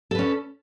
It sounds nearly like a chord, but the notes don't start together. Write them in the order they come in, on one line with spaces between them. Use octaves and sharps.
A4 B4 C#4